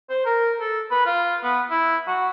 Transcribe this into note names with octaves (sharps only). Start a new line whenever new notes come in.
C5
A#4
A4
B4
F4
B3
E4
F#4